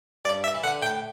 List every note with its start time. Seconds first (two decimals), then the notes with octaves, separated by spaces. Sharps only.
0.25 G2 D5
0.44 E5
0.54 E3
0.63 D3 F#5
0.82 A2 G5